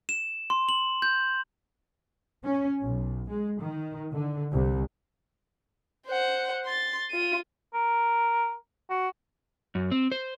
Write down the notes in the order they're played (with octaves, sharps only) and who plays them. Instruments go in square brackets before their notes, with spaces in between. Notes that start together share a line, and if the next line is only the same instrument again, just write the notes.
[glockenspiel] E7
C6
F#7
G6
[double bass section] C#4
B1
G#3
D#3
D3
C2
[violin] C5 F#5
C6 A6
F4 D#7
[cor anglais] A#4
F#4
[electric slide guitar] F#2
C4
C5